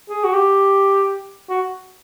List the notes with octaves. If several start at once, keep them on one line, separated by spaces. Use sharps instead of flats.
G#4
F#4
G4
F#4